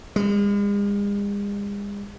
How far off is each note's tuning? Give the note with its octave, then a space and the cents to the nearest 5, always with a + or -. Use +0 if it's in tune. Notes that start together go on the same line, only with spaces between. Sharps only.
G#3 -45